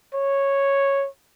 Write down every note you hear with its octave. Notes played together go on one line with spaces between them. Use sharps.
C#5